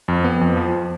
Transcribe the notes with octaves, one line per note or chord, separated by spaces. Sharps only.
F2
B3
F2
F3